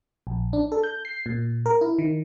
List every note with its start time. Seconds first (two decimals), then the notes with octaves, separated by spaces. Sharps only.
0.27 A#1
0.53 D4
0.72 A4
0.83 G6
1.05 C7
1.26 A#2
1.66 A#4
1.81 E4
1.98 D#3